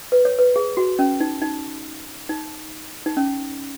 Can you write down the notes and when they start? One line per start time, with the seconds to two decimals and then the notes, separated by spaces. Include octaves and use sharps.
0.12 B4
0.25 C#5
0.39 B4
0.56 G#4
0.77 F#4
0.99 C#4
1.20 D#4
1.42 D#4
2.29 D#4
3.06 D#4
3.17 C#4